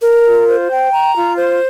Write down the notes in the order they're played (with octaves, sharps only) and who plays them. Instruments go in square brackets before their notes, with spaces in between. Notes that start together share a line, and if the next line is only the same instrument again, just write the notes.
[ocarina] A#4 [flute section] A#5
[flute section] F4
C5
G5
A#5
F4
C5